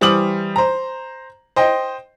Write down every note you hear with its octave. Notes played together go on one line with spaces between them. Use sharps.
E3 G3 C5 D6 D#6 F#7
C5 A#5
C5 D#5 G5